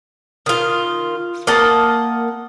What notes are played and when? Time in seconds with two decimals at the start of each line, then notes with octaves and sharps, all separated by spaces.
0.46 D#3 F4
1.47 A#3 D#5 F#5 A5